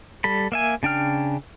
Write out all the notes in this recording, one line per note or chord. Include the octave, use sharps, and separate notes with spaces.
G3 A4 B5
A#3 E5 G#5
C#3 D4 G5 F6